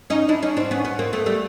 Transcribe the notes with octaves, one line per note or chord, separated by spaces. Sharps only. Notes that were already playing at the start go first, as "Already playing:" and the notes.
C#4 D#4
D4 E4
C#4 D#4
C4 D4
B3 C#4
B3 C#4
A#3 C4
A3 B3
G3 A3